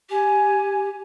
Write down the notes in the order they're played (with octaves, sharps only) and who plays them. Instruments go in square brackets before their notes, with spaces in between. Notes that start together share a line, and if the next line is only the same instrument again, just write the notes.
[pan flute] G4 [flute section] G#5